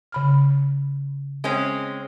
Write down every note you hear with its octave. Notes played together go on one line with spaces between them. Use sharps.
C#3 B5 F6
G#3 C4 C#4